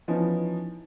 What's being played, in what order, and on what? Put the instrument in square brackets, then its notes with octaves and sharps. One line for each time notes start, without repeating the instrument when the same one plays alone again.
[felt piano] E3 F3 B3 C#4 D#4